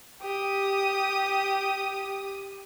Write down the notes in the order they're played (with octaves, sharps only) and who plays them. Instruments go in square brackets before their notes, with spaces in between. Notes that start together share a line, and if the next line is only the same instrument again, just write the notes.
[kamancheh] G4 D#6